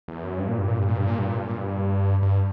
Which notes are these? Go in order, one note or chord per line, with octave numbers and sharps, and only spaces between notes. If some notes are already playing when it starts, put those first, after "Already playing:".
E2
F#2
G2
A#2
G2
A#2
G2
A#2
G2
A#2
G2
A#2
G2
A#2
G2
G2